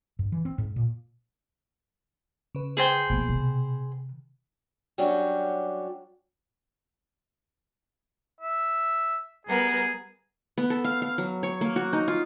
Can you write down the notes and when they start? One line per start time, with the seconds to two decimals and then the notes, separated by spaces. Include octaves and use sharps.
0.19 G2
0.32 E3
0.45 C4
0.58 G#2
0.76 A#2
2.55 C#3 B4
2.77 G#4 C5 G5
3.10 B2 F3 A#3
3.28 C3 D#3
4.98 F#3 G3 C#4 D4 F#4 G4
8.41 E5
9.47 G3 B3 G#4 A#4
10.58 B3
10.70 A4
10.84 F5
11.02 F5
11.18 F#3
11.43 C#5
11.61 A#3
11.76 F#4
11.93 D#4
12.08 F4